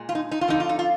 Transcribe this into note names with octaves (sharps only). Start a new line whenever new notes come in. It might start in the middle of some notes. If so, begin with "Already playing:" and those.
Already playing: A#2 G#3
F4
D#4
D#4
F4
F2 D3 F3 D#4
F4
D#4
F4